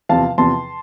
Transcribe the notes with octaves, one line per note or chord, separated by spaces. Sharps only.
E2 C3 F3 F5 A5
E2 C3 F3 A5 C6